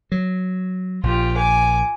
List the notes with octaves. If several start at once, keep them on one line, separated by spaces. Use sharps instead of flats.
F#3
A#1 F4 G4
G#5 D6